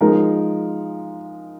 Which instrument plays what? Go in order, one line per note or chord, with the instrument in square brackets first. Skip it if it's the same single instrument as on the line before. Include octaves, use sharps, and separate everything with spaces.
[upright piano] F3 G#3 D#4 A#4